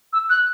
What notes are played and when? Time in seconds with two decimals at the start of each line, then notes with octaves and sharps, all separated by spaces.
0.13 E6
0.30 F#6